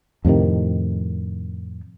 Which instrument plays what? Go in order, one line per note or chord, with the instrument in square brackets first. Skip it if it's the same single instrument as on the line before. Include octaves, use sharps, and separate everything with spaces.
[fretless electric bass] F2 A2 C3 D#3